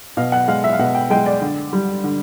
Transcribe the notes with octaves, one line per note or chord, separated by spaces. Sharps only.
B2 F5
F#5
G#3 F5
E5
F5
B2 F#5
G5
G#3 G5
D5
D3
G3
D3